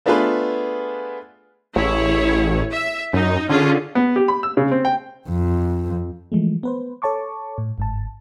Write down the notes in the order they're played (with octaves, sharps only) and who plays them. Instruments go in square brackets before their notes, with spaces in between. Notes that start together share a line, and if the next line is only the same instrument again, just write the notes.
[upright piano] A3 B3 D4 F4 G#4 B4
[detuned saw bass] A1 [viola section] E4 G#4 C#5
[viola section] E5
[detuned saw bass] F#2 [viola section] D#4
[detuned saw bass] D3 [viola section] C#4 F4 G#4
[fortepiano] B3
G4
B5
E6
C#3
C4
G5
[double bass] F2
[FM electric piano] E3 F3 G#3 A3
B3 B4 C5
A4 C#5 A5 C#6 D6
A2
G1 G#2 A5